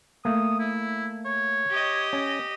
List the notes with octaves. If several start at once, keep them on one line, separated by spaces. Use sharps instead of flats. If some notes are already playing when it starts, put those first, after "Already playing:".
A3 A#3 D#6
E4
C#5
G4 D#5
C#4